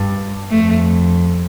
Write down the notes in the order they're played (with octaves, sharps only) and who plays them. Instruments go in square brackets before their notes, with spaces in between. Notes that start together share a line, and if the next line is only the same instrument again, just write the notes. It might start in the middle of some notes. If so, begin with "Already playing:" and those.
Already playing: [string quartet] G2
[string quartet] F2 [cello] A3